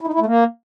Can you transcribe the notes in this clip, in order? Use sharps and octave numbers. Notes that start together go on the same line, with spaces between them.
E4
D#4
E4
A3
A#3